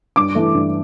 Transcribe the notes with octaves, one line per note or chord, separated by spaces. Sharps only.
G2 D6
E3 A3
G2